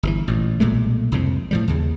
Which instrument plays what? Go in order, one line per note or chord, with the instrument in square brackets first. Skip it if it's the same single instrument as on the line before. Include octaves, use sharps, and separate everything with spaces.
[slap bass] G1 B2 E3
A1 A#2
B1 A#2 G#3 A3
C2 F2 A2 C3
A2 F3 G3
D#2 C#3